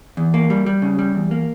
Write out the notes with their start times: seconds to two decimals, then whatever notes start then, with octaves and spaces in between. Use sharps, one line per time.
0.17 E2
0.34 A#3
0.50 G3
0.66 G3
0.82 C#3
0.99 G3
1.15 E2
1.31 A#3